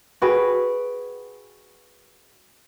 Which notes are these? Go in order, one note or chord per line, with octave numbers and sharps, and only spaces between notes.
F#4 G#4 B4 G5